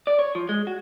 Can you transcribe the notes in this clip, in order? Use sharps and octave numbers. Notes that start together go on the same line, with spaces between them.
D5
C#5
F3
G#3
F#4